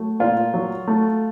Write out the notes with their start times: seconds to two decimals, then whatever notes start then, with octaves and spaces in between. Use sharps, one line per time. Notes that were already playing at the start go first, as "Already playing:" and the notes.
Already playing: F#3 A3
0.20 A#2 F4
0.54 F#3
0.87 A3